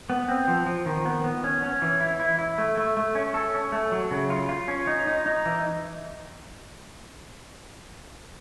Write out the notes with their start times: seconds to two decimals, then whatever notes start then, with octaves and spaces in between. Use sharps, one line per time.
0.10 B3
0.28 C4
0.48 F3
0.67 F3
0.86 D#3
1.05 B3
1.24 B3
1.44 C#4
1.62 C#4
1.82 E3
2.00 E4
2.20 E4
2.39 E4
2.58 A3
2.77 A3
2.97 A3
3.15 C#4
3.34 A4
3.54 C#4
3.72 A3
3.92 F#3
4.11 C#3
4.30 F4
4.49 F4
4.68 C#4
4.87 D#4
5.07 D#4
5.26 D#4
5.46 E3